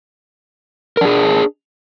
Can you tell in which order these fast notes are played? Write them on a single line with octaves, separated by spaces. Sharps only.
A#4 D4 G#4